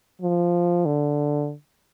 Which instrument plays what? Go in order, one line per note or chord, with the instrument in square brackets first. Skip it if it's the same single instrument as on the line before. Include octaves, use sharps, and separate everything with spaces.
[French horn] F3
D3